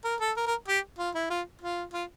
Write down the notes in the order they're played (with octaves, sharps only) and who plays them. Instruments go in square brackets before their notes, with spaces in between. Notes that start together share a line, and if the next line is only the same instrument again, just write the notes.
[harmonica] A#4
A4
A#4
A#4
G4
F4
E4
F4
F4
F4